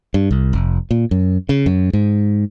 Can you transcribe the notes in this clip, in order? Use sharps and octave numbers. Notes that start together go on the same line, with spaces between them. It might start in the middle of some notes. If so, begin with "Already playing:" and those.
G2
C2
F1
A#2
F#2
C#3
F#2
G#2